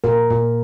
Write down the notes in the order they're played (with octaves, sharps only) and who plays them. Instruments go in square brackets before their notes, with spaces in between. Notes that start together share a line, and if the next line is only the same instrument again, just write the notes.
[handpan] A#2 A#4
A#2